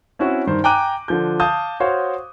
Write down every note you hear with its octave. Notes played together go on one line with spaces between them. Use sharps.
C4 C#4 E4 F#4
G2 D#3 C5
G5 G#5 A#5 D6 F#6 D#7
D3 F3 G6
F5 A5 D#6 G6
F#4 C5 C#5 F5